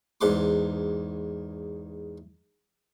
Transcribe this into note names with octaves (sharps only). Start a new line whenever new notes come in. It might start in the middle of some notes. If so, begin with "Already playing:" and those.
E2 G#2 F#5 C6 D6